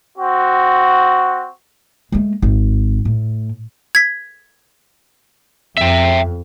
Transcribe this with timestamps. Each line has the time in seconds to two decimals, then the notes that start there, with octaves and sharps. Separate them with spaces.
0.16 C4 F#4
2.12 G#3 A3
2.42 G#1
3.05 A2
3.95 G#6 B6
5.77 F2 E5 G5